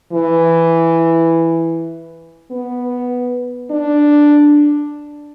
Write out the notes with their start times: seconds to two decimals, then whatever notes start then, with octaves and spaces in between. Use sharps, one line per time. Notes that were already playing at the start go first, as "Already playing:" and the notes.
0.12 E3
2.51 B3
3.71 D4